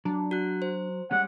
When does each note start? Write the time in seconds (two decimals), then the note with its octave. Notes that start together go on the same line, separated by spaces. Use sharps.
0.05 F#3 D4
0.31 F#4 F#6
0.62 C5
1.11 G3 G#3 C#4 F#5